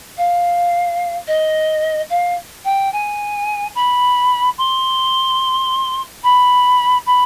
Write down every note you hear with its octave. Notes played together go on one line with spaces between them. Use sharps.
F5
D#5
F5
G5
G#5
B5
C6
B5
B5